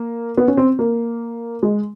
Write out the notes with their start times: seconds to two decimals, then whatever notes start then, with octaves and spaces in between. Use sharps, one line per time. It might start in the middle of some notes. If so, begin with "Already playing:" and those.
Already playing: A#3
0.37 B3
0.48 C#4
0.57 C4
0.79 A#3
1.63 G#3